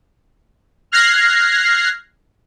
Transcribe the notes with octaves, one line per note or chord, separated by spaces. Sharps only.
F6 F#6 G#6 A#6 C7